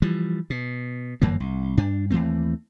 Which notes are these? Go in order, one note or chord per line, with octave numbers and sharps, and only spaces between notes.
E3 F3 G3
B2
G1 F#2 E3 A#3
C2
G2 D4
D#2 E3 A3 C4